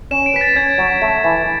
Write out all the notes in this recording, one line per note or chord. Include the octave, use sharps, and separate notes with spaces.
C#4 E7
D7
B4 B6
A6
C#4 G#6
F#3
A3
E3